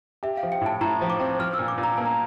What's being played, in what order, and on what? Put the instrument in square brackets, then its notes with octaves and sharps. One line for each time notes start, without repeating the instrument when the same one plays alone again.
[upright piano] G4 [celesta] E5
[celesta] F5
[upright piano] F3
[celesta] G5
[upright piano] A2 [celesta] A5
[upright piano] A2 [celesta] A#5
[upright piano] F3
[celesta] D6
[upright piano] C4
[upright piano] F3 [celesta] F6
[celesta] E6
[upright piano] A#2
[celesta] D6
[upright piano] A#2
[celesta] A#5
[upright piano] A#3 [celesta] A5
[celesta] A#5